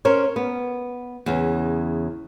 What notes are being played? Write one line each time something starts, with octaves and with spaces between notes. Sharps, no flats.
C#4 A#4 C5 C#5
B3
E2 C#3